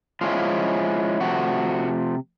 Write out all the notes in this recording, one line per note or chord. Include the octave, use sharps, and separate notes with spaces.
F3 G#3 C#4 E4 F4
C3 F3 A3 F#4